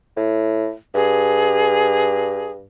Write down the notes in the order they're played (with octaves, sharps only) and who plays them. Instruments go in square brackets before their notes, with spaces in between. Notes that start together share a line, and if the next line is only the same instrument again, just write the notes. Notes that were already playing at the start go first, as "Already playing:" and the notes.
[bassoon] A2
[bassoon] G2 [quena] G#4